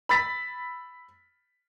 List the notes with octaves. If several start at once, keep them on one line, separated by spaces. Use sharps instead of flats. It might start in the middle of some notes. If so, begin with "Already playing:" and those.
B5 E6 A6 B6